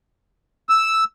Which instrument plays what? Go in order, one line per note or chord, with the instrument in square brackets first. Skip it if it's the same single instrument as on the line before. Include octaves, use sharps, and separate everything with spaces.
[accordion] E6